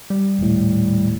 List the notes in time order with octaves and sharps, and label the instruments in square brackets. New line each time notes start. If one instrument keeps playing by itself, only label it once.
[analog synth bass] G3
[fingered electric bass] D#1 A2